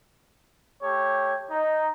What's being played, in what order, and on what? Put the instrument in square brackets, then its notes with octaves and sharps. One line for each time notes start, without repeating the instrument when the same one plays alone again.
[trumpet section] A3 G4 C#5
D#4